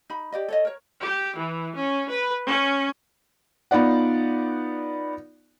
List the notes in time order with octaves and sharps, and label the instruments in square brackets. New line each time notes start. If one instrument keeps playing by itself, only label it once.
[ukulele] D#4 B5
G4 D5 D#5
A4 C#5 D#5
A#4 C#5
[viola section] G4
E3
C#4
B4
C#4
[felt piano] B3 D#4 F4 D5 F#5